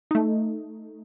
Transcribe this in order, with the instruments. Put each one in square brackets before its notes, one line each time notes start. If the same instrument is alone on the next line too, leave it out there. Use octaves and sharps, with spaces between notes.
[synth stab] A3 D#4